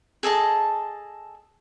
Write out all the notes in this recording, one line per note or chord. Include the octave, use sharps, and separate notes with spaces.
G#4 A4 D#5 A5